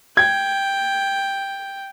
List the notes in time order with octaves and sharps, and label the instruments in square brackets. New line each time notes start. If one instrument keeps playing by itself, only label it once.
[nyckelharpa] G5 [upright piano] G#6